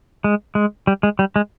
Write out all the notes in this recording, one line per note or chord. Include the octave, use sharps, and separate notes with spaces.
G#3
G#3
G3
G#3
G3
G#3